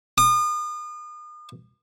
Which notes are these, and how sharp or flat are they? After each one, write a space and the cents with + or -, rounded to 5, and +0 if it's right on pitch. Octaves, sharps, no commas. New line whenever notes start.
D#6 -40